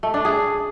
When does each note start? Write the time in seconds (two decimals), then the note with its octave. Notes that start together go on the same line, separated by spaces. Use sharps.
0.03 A3
0.14 D4
0.25 G#4